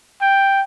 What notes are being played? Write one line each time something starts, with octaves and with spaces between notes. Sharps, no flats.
G5